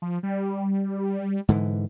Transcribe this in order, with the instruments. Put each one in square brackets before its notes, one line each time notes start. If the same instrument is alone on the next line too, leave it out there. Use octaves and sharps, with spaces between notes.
[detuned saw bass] F3
G3
[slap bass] G#2 D3 E3